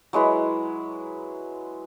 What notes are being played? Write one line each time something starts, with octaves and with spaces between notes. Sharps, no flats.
F#3 G#3 E4 B4